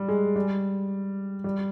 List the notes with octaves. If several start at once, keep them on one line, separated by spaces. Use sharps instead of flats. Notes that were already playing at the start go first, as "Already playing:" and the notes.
Already playing: G3
G#3
G3
G3